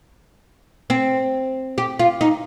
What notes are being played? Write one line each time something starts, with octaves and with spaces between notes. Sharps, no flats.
C4
G4
F4
D#4